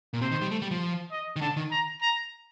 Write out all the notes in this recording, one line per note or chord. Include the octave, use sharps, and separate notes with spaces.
A#2
C3 C5
D#3
G3
A3
G3
F3
D#5
D#3
D3 A5
D#3
A#5
A#5